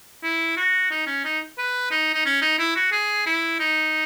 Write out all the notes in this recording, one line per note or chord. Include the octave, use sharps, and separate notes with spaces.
E4
F#4
D#4
C#4
D#4
B4
D#4
D#4
C#4
D#4
E4
F#4
G#4
E4
D#4